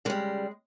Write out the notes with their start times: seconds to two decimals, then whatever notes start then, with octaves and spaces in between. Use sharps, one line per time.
0.05 C#3 G3 G#3